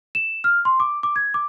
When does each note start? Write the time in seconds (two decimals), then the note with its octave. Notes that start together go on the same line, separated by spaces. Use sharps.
0.15 E7
0.44 F6
0.65 C6
0.80 D6
1.03 D6
1.16 G#6
1.34 D6